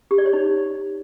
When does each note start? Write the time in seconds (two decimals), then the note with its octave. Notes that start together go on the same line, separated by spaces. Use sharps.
0.11 G4
0.18 D5
0.26 C#5
0.33 D#4